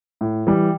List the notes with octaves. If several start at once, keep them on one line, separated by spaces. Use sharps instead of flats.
A2
E3 G3